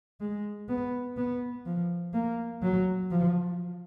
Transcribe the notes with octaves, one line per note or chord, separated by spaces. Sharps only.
G#3
B3
B3
F3
A#3
F#3
F3